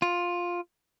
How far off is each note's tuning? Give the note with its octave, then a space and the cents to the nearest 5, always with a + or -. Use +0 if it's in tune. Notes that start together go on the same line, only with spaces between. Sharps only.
F4 +10